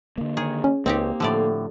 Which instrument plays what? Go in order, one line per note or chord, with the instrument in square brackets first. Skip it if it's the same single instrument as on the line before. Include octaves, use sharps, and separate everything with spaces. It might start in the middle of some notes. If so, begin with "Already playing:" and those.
[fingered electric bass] D3 A#3
[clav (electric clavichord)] D#3 C#5 [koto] G#4
[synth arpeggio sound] C#4
[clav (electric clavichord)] C#2 [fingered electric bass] A#3 [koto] C4 D#4 G4
[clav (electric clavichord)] A2 D3 [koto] F3 A3 D5